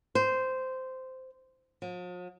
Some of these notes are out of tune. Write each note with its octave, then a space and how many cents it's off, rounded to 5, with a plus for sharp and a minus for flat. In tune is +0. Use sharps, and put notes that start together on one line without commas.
C5 -10
F3 +45